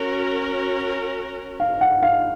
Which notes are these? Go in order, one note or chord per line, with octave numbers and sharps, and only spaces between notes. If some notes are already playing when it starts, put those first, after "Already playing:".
Already playing: C#4 F#4 A#4
F5
F#5
F5